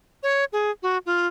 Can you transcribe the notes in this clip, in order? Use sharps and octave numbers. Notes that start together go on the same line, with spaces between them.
C#5
G#4
F#4
F4